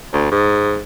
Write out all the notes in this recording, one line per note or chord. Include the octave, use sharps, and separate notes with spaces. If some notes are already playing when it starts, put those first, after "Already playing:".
D2
G#2